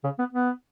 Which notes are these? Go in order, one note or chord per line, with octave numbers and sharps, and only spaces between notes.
C#3
B3
B3